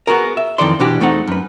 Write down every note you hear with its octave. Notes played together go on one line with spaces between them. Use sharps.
B3 F#4 G#4 A#4
E5
F2 D#3 E3 A4 D5 C6
B2 E3 D4 F#4 G4
E2 A3 C4 D#4 F#5
F#2 B4